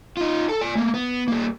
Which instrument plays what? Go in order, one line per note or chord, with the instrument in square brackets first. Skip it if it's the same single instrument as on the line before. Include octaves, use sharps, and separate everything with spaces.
[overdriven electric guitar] D#4 F4
A4 A5
D5 G#5
A3 A#3
B3
G3 A#3